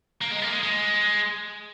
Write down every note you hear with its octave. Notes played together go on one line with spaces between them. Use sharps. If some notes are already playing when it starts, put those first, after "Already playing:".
A#3
G#3
A#3
G#3
G#3